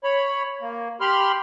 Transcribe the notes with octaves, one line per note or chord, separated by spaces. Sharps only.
C#5 B5
A#3
G4 B5 C6 F6